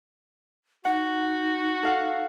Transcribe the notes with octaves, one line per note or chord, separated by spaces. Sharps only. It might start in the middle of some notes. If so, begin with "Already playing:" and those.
D#4 F#4 F#5
A4 F5 F#5